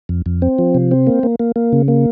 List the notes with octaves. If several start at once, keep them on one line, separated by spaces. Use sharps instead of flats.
F2
F2
C4
F3
C3
C4
A#3
A#3
A#3
A#3
C#3
A#3